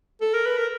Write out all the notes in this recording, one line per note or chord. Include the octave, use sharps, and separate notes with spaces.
A4
A#4
B4
A#4